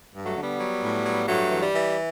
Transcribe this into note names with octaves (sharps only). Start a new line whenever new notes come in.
G2
F#3 A3
D3
G3 B3
F#3
A2
F#3
G2 F#3 A3
E3
G3
E3